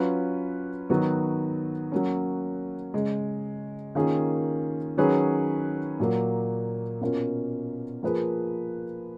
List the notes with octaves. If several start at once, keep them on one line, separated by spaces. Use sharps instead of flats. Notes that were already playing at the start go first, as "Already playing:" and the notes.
Already playing: F#3 C#4 F4 B4
D#3 F#3 B3 F#4
F#3 A#3 C#4
C#3 G#3 C#4
D#3 A#3 C#4 F4 G#4
D#3 F#3 C#4 G#4 B4
A#2 F#3 A#3
B2 A#3 C#4 F4 A#4
F3 A#3 F4 G#4 B4